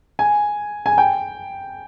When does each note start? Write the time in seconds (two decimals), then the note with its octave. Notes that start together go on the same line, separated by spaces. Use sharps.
0.19 G#5
0.86 G#5
0.98 G5